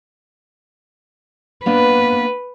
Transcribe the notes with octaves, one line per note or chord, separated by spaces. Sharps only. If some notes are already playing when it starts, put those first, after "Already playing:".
A#3 B3 D4 B4